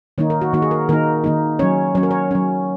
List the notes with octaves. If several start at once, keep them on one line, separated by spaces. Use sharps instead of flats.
D#3 A#3 D#4 C#5
A#4
F#4
D#3 A#3 D#4 F#4
G#4
A#4
D#3 A#3 D#4 A#4
D#3 A#3 D#4
F#3 C#4 C#5
F#3 C#4 C#5
A#4
C#5
F#3 C#4